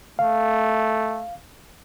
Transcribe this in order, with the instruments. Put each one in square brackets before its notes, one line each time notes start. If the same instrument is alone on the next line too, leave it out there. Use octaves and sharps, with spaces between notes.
[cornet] A3 [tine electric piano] F5